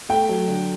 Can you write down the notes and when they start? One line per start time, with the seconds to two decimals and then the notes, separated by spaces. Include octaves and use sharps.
0.09 A3 G5
0.29 F#3
0.48 D3